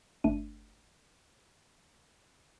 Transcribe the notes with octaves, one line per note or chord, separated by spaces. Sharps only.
G1 A3 D4 D#7